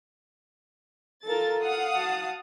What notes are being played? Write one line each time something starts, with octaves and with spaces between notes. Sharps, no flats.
F4 A4 A#4 A6
F5 F#5 D#6
F#4 A5